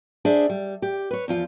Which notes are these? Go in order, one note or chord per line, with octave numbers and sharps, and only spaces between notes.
D4 G#4 C5 E5
G3
G4
B4 C#5
E2 F3 F4